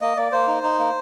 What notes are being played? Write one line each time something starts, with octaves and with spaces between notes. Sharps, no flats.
A#3 D#5
A#3 D5
A#3 C5
D#4
D#4
A#3